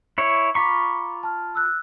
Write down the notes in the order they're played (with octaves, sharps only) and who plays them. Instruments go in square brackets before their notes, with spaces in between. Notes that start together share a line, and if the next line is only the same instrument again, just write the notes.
[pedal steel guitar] E4 C#5
[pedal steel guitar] F4 B5 C#6 [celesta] A#5 D6
[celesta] A5 F6
E6 F#6